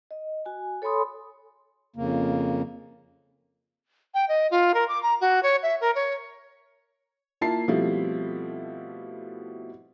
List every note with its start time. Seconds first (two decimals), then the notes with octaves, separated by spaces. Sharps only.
0.11 D#5
0.46 F#4 G#5
0.82 A4 C#5 G#5 B5 C6 D#6
1.96 F2 C#3 A#3
4.14 G5
4.29 D#5
4.51 F4
4.74 A#4
4.88 D6
5.03 A#5
5.21 F#4
5.43 C#5
5.63 E5
5.81 A#4
5.95 C#5
7.41 A#3 E4 F4 A5 C7
7.68 B2 F3 G3 A3 C4 E4